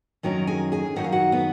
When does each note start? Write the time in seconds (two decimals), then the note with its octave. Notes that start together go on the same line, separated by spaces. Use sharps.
0.23 F#2 D#3 F#3 C#4 A#4 A#5
0.47 G#4 G#5
0.72 G#4 G#5
0.96 F#2 D#3 F#3 D#4 F#5
1.04 F5
1.12 F#4 F#5
1.32 B3 B4